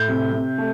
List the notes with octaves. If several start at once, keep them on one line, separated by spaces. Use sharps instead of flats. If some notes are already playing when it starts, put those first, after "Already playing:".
Already playing: A2 G6
C3
C3
A3